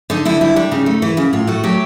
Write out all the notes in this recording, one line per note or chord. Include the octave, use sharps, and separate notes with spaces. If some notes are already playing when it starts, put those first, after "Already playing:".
D3 D#4
D3 E4
G3 E4
G3 D4
C#3 D#4
A3
E3 E4
C#3 E4
A2 F4
A3 F#4
F#3 G4